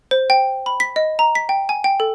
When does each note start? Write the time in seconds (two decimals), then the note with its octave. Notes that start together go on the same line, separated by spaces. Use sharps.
0.11 C5
0.30 G5
0.66 B5
0.80 B6
0.96 D#5
1.19 A#5
1.35 B6
1.49 G5
1.69 G#5
1.84 G5
2.00 A4